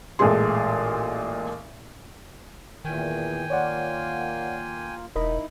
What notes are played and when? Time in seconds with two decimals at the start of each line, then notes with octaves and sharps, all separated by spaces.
0.19 A1 A#2 G#3 A3 G#4 C6
2.85 E2 A#2 D#3 E3 G5 G#5
3.50 A#3 F4 C#5 D5 F#5
5.16 E1 D#4 E4 A#4 D#5 B5